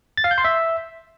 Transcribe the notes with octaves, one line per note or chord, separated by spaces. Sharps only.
A6
F5
G6
C6
E5